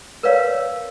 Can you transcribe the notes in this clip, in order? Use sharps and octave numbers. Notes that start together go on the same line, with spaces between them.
A#4 B4 C#5 D5 F5